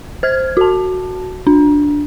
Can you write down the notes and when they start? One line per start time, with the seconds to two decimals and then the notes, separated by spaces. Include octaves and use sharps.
0.23 C5 F6 G#6
0.57 F#4 A5
1.47 D4